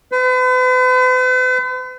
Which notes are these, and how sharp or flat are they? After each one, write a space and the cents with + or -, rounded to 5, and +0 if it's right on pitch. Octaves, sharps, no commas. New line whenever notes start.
B4 +45